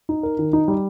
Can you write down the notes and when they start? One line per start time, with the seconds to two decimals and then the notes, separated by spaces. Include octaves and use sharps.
0.09 D#4
0.23 A#4
0.39 D#3
0.53 D#4
0.68 G3